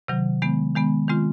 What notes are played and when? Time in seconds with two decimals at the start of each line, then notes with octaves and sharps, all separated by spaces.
0.08 C3 D#3 F#3
0.42 D#3 G#3 B3
0.75 D#3 G#3 B3
1.08 D#3 G#3 C4 F4